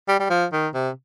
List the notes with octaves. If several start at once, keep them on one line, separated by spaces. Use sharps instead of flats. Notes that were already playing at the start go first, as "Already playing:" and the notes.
G3
G3
F3
D#3
C3